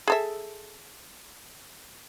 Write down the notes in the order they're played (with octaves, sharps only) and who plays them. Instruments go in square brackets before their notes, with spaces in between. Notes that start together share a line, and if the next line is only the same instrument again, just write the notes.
[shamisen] G#4 A4 E5